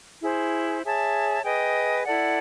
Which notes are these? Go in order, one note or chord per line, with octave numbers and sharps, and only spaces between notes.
E4 G#4 C5
G#4 C#5 E5 A5
G#4 B4 D#5 G5
E4 A4 D5 F#5